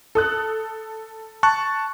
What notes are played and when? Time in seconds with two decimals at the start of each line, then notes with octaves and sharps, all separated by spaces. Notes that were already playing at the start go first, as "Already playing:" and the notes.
0.15 A4 D#6 F#6
1.43 A5 C#6 F#6